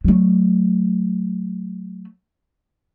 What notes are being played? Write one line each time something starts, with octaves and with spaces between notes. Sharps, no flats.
F#3 A3